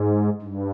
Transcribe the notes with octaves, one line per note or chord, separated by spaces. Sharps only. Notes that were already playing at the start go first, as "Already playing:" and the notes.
Already playing: G#2
G2